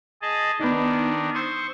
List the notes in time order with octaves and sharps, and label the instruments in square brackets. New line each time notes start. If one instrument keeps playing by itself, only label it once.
[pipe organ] G#4 D#5 A5
[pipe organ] D#3 D4 [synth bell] B3 D#4
[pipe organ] C5 C#6 [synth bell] D#6 E6